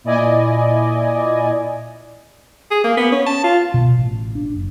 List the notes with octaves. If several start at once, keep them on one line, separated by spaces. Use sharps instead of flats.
A#2 E4 D5 D#5 G#5
G#4
A#3
B3
C#4
A5
F4
B2
A1
D4
F#1